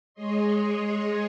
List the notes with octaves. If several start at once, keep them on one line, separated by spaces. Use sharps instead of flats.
G#3 G#4 C#5 D#5 C6